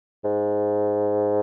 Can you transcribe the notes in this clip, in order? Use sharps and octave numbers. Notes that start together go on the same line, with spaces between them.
G#2